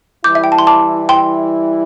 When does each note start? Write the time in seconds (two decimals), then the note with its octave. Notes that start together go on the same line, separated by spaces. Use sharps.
0.24 E3 G3 E4 D6 G6
0.35 E5
0.44 G5
0.52 A5
0.59 C6
0.67 A5 D6
1.09 G5 C6